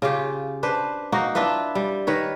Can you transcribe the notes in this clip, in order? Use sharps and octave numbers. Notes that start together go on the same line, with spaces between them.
C#3 F4 G4
D4 B4 C5
A#3 D#4 F#4
D4 E4 F4 B4
G3
D#3 B4 C#5